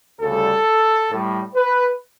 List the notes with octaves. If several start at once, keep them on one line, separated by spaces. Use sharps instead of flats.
D2 C#3 G3 A4
A2 G3
B4